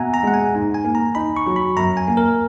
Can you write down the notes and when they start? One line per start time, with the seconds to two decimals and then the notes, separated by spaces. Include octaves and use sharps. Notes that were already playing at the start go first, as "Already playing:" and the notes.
Already playing: B2 E5 F#5 G#5 A#5
0.14 A#5
0.23 G#3 F#5
0.34 G#5
0.54 G#2
0.74 G#5
0.84 A#3
0.95 A#5
1.15 D#4 B5
1.36 C#6
1.46 F#3
1.56 B5
1.77 F#2 A#5
1.97 G#5
2.08 A#3
2.17 A#4